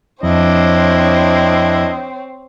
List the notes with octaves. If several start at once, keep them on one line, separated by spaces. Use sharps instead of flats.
F2 C4 D4 E4 C#5 D#5